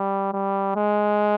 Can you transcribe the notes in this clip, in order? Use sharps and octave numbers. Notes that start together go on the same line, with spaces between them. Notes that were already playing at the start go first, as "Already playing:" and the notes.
Already playing: G3
G3
G#3